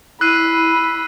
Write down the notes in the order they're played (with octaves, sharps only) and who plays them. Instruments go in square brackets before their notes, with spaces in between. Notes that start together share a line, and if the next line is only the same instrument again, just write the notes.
[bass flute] E4 [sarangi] B5 [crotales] E6 C7 D#7 [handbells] F#6